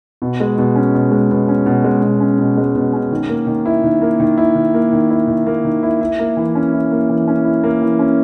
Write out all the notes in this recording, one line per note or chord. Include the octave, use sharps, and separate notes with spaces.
B2
G#3
B2
C#4
B2
G#3
B2
C#4
B2
G#3
B2
C#4
B2
G#3
B2
C#4
D#3
A#3
D#3
E4
D#3
A#3
D#3
E4
D#3
A#3
D#3
E4
D#3
A#3
D#3
E4
E4
A#3
E3
C#4
E4
A#3
E3
C#4
E4
A#3
E3
C#4